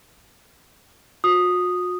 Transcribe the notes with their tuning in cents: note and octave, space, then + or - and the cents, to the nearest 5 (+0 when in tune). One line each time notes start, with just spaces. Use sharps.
F#4 -45 D#6 -5